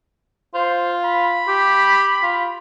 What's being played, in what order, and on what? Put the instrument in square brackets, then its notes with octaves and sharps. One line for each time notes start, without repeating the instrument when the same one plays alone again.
[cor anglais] F4 [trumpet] C5
[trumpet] B5
[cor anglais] G4
F4